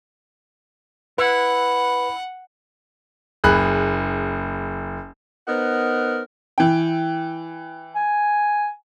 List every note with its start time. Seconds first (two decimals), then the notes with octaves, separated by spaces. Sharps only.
1.18 E4 B4 F#5
3.44 F#1 G#4 B5 F#6
5.47 B3 D#4 A#4 C5 F#5
6.58 E3 G5
7.95 G#5